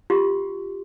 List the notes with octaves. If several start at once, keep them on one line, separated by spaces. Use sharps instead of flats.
F4 G4 C6